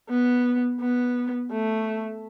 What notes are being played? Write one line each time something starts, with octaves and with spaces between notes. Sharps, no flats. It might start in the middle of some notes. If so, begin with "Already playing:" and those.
B3
B3
A3